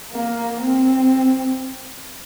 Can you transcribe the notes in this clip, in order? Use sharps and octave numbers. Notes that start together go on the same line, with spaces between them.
A#3
C4